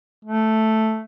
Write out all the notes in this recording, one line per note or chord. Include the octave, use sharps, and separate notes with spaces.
A3